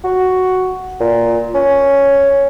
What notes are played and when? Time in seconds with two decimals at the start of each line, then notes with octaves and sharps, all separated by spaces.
0.04 F#4
1.00 A#2
1.55 C#4